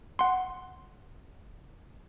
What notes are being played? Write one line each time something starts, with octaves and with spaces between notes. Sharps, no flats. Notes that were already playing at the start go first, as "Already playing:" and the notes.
F#5 C6